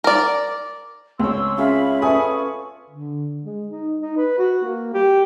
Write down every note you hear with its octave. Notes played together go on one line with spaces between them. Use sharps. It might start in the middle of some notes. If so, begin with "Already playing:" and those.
A#4 D5
C#2 C4 C#5 C6 E6
C#4 F4 G#4 E5 F5 B5
A4 B4 C#5 G#5 D#6
D3
G#3
D#4
D#4
B4
F#4
A#3
G4